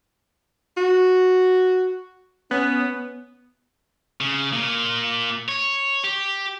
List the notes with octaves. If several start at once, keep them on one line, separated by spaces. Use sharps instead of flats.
F#4
B3 C#4
C#3
A#2
C#5
G4